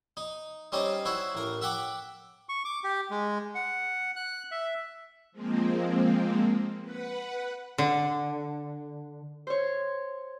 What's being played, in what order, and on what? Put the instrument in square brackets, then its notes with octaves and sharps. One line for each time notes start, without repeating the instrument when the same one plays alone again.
[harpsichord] D#4
G3 C4 C#4 D#4 C5 D#5
E4 F#4 C5 C#5
A1 A#4
E5 F#5 G5 D6
[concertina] C#6
D6
G4
G#3
F#5
F#6
E5
[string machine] F3 G#3 A#3 C4
B4 F#5
[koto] D3
[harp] C5 C#5